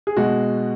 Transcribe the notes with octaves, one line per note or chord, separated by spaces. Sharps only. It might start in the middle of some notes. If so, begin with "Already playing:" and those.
G#4
B2 G#3 F#4